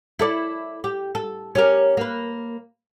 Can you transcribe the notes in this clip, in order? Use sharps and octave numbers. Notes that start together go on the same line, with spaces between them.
E4 A4 D5
G4
A4
C#4 G4 A#4
A#3 B4